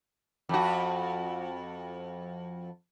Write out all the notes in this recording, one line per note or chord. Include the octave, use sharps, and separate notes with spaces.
F2 F#4